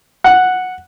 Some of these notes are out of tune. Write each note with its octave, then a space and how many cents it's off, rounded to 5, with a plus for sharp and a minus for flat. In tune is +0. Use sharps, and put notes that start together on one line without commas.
F#5 -5